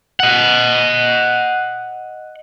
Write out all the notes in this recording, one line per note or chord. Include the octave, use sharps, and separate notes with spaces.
D#5 F#5